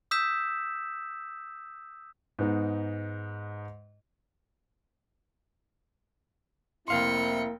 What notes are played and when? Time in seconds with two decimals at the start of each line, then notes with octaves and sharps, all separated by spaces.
0.11 D#6 E6 G6 B6 E7
2.39 G#2 B3 D#4
6.88 F1 A#3 C4 E4 F5 G5 C6 C#7